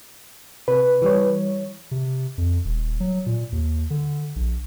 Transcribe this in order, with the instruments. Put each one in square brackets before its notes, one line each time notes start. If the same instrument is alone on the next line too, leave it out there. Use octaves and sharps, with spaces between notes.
[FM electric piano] C3 [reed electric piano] B4
[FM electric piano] E3 G3 C#5
[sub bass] C3
F2
D#1
F#3
A#2
D#2
D3
A#1